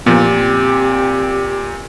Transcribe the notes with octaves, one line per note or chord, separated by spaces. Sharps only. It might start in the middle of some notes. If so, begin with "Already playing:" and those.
A#2 F3 B3 C4 G4